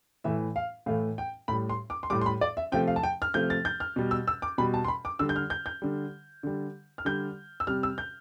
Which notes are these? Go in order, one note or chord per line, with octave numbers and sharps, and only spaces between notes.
A2 E3 A3 E5
F5
A2 E3 A3 F5
G5
A2 G3 B5
C6
D6
C6
A2 G3 D6
C6
B5
D5
E5
C3 F3 A3 G5
F5
A5
G5
F6
C3 F3 A3 G6
A6
G6
F6
B2 G3
E6
E6
D6
B2 G3 B5
A5
C6
B5
D6
D3 G3 E6
G6
F6
G6
G6
D3 G3
D3 G3
F6
D3 G3 G6
E6
C3 G3 F6
E6
G6